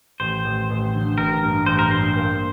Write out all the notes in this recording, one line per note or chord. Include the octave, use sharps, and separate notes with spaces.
A1 C5
A1
A1
D3
A1 A#4
G2
A1 C5
A#4
G2 C5
A#3